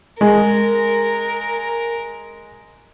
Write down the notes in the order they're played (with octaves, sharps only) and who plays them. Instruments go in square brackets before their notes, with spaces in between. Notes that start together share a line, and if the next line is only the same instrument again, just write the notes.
[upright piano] G#3 [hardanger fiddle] A#4